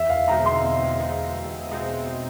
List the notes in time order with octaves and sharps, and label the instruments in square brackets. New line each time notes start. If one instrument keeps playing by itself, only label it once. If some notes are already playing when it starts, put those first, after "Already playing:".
Already playing: [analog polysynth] E2 [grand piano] E5
[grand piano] F5
[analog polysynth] B2 G#3 C4 D#4 [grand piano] A#5
[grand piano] C6
[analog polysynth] E2
B2 G#3 C4 D#4
E2
B2 G#3 C4 D#4